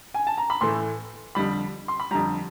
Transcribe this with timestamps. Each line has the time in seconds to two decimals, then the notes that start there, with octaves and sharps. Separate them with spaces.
0.14 G#5
0.27 A5
0.38 A#5
0.50 B5
0.61 A2 E3 A3 C6
1.35 F2 D3 G3 B5
1.88 C6
2.00 B5
2.11 F2 D3 G3 A#5